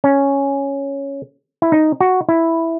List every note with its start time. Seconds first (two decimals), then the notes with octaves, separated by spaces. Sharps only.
0.04 C#4
1.62 E4
1.72 D#4
2.00 F#4
2.29 E4